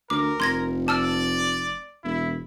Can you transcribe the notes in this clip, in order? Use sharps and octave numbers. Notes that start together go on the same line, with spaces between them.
D2 A#4 D6
F1 C6 G#6 A#6
D5 A5 E6 F6
E1 E4